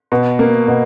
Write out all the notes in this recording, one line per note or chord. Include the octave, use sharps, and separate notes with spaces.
B2
A#3
B2